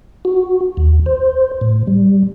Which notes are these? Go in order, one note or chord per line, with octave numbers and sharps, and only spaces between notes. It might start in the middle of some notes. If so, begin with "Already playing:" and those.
F#4
D#2
C5
A2
G3